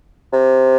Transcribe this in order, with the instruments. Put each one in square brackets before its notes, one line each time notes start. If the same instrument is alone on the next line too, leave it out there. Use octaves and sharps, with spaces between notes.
[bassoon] C3